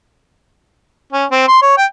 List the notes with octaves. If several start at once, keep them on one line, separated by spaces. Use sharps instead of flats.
C#4
C4
C6
C#5
G5